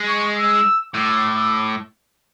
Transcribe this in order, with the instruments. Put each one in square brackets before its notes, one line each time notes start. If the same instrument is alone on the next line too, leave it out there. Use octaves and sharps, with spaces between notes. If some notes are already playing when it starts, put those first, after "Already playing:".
Already playing: [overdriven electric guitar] G#3
[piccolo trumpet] C#6
E6
[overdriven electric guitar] A2 [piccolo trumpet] D6